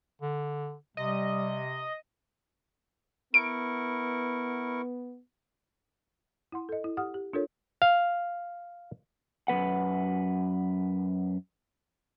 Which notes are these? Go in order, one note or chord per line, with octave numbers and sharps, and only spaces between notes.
D3
C3 G3 D#5
B3 E4 A#4 C#6 D7
E4 F#5 C6
A4 D#5
E4
G4 F#5 D#6 F6
G4
D4 F4 A4 A#4 C#5
F5
F#2 F3 B4 F#5